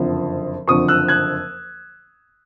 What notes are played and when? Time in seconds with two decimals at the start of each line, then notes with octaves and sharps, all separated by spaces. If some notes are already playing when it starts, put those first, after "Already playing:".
Already playing: F#1 F2 D3 F3
0.68 F#1 F2 D3 F3 C#6 D#6
0.88 E6 F#6
1.08 F#6 G#6